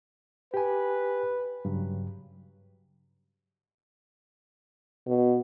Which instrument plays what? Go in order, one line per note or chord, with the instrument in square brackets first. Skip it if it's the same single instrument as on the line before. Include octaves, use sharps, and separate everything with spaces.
[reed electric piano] G4 G#5 [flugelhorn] B4
[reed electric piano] G2 C#3 F#3
[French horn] B2